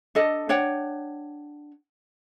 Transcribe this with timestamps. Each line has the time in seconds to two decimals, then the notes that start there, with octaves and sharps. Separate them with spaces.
0.15 D4 A4 D#5
0.49 D4 C#5 F#5 G5